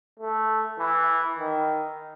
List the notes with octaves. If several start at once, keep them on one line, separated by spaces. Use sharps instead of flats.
A3
E3
D#3